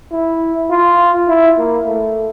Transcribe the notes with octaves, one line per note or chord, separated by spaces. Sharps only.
E4
F4
E4
A#3
A3